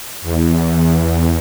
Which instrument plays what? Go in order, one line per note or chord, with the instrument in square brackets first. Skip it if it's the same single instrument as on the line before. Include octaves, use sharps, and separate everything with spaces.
[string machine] E2